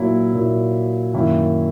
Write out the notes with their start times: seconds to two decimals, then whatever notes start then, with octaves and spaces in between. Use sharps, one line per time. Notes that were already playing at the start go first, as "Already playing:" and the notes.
Already playing: A#2 F#3 A#3 E4
0.33 A#2 F#3 A#3 E4
1.14 F#2 D#3 A#3 E4